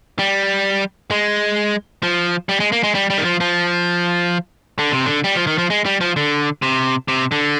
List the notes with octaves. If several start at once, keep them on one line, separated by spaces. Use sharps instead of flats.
G3
G#3
F3
G3
G#3
A#3
G#3
G3
G3
D#3
F3
F3
D3
C3
D3
G3
F3
D#3
F3
G#3
G3
F3
D3
C3
C3
D3